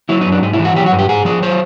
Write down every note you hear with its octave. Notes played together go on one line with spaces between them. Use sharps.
F#3 E4
D#4
F#2
D4
G#2 D#4
E4
E3
F#4
F#3 G4
F#4
G2
G4
G#2 G#4
F3 G#4
F#3 C5